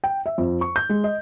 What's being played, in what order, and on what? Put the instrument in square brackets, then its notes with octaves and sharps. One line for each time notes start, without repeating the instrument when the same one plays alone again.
[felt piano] G5
E5
F2
C#6
G6
G#3
D#5